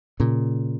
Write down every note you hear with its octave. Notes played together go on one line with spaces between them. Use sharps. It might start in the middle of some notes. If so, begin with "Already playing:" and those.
A#2 C#3